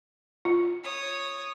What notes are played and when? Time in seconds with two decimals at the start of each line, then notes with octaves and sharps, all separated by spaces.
0.45 F4
0.83 C#5 D#6